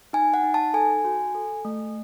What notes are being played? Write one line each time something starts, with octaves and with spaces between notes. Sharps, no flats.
D#4 G#5
F#5
D#4
A5
A4 G#5
F#4
A4
A3